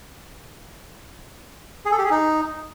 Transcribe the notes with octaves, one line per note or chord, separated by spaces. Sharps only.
G#4
A4
G4
G#4
D#4